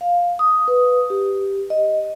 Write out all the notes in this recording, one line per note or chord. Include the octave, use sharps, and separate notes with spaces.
F5
D#6
B4
G4
D#5